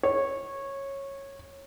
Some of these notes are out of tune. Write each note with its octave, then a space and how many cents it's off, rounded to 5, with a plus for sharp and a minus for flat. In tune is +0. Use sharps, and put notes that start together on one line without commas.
C#5 -15